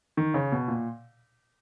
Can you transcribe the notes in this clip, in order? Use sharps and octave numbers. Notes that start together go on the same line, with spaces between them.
D#3
C#3
B2
A#2